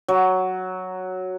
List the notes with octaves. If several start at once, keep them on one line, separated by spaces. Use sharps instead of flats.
F#3